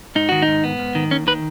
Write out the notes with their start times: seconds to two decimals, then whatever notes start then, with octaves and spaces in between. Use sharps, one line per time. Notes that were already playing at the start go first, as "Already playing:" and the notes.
0.15 G#2 D#4
0.29 D#3 F#4
0.42 D#4
0.48 G#2
0.64 B3
0.79 G#2
0.95 D#3
1.11 D#2 C#4
1.27 D#3 B4